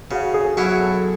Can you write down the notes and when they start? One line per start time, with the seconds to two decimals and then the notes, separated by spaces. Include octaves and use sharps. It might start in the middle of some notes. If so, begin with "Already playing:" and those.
0.11 C#3 F#4
0.34 G#4
0.57 F#3 C#4 E4 F#4
0.80 A4